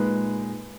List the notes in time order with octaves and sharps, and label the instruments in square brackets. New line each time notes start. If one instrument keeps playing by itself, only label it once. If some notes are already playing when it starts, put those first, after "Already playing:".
Already playing: [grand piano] A#2 G#3 D#4 B4